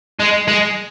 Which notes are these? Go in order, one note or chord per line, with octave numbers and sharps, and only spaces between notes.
G#3
G#3